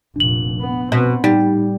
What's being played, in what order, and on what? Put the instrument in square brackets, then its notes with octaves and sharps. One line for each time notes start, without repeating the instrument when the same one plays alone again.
[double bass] F1 A#2 [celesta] D4 F#7
[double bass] B3
[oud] B2 [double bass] B3 C4
[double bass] A2 [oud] G3 [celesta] D#4